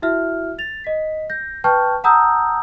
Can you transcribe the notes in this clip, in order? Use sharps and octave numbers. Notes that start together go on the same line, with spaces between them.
E4 F#4 E5 F6
A6 F7
D#5 B6
G6 A#6
B4 G5 A5 C#6 F6 G6
F#5 A5 A#5 D#6 E6 G6